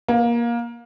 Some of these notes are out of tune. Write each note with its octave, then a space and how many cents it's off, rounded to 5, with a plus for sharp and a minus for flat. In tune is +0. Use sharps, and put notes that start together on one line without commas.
A#3 +20